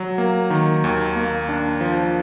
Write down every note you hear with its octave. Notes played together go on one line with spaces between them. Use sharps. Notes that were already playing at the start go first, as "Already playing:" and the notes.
Already playing: F#3
A#3
D#3
D#2
A#3
D4
F3